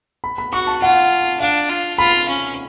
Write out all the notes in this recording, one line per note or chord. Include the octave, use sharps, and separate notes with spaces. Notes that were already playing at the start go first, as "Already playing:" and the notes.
B5
B5
F#4 C#6
A5
F4 F#5
D4 F5
F4
F4 B5
C#4